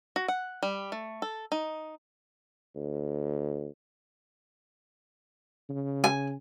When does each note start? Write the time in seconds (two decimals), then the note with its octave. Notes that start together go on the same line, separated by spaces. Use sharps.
0.16 F#4
0.28 F#5
0.63 G3
0.92 A3
1.22 A4
1.52 D#4
2.76 D2
5.70 C#3
6.04 G#5